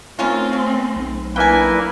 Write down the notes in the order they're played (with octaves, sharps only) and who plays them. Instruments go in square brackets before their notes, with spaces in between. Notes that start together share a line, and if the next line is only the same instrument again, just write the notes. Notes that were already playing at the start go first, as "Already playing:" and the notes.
[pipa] D#3 C#4 F4 [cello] A3 C4
[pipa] C#4
[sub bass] B1
[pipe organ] A#3 E4 B4 [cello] D4 [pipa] G5 G#5